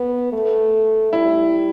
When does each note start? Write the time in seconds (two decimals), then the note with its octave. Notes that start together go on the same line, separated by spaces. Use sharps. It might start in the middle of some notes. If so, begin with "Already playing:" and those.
Already playing: B3
0.33 A3
1.13 G3 E4